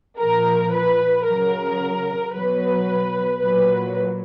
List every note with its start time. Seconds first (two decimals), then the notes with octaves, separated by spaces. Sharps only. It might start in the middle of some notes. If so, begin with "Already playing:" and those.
0.18 A#2 F3 A#4
0.72 B4
1.25 C#3 F#3 A#4
2.34 B2 F#3 B4
3.41 A#2 F#3 B4